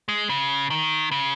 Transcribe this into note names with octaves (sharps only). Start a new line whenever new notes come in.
G#3
C#3
D#3
C#3